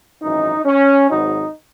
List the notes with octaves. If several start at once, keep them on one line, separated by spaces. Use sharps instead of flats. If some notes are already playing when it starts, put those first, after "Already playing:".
G#1 F#2 E3 D#4
C#4
G#1 G#2 F#3 D#4